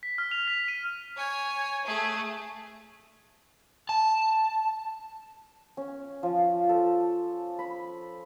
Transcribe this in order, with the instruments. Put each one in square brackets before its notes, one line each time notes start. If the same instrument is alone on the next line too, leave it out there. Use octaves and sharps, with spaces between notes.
[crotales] B6
F6
F7
B6
D#7
[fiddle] C#5 G#5
A3 G#4
[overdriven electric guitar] A5
[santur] C#4
F3
A4
B5